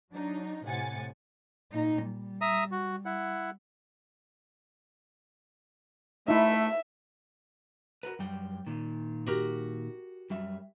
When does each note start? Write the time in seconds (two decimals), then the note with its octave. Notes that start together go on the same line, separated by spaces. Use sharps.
0.12 F#3 D4 D#4
0.65 A2 C3 F#5 G#5 A6 C#7
1.72 A#2 D#4
2.06 G3
2.41 E5 A#5 D#6
2.71 F#4
3.05 E4 F#5
6.28 A3 D#4 E4 E5
8.03 F#4 A#4 B4
8.19 F#2 G3 G5
8.67 A#2 D#3
9.26 F#4 G4 A#4
10.30 F#2 G3 E5